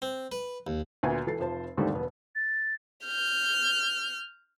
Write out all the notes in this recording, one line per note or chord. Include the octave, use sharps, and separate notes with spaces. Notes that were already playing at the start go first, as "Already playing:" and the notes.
C4
B4
D#2
D2 A#2 B3 G#5
E3 A4 A6 C7
F1 F3 C5 A5
D#2 G#2 D3 G3 A3 C4
E1 B3
A6
F6 G6